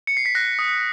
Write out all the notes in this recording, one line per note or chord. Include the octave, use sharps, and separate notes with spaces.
C#7
C7
B6
F#6 A#6
D#6